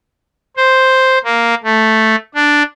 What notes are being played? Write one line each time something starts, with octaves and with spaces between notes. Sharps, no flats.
C5
A#3
A3
D4